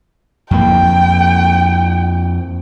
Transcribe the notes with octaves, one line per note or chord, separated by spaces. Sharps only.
F2 A#3 G5